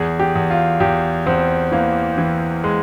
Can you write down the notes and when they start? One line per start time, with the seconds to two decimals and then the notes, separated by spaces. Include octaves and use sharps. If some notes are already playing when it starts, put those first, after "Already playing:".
Already playing: E2 G#4
0.19 G4
0.35 E2
0.50 F4
0.80 E2 G4
1.26 E2 C4
1.72 E3 A#3
2.18 E3
2.64 G#3